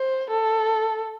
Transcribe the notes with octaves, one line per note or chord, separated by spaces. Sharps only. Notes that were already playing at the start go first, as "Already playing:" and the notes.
Already playing: C5
A4